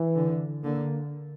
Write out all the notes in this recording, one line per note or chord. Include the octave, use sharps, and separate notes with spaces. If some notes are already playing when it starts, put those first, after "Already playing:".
Already playing: E3
D3
D3 A#3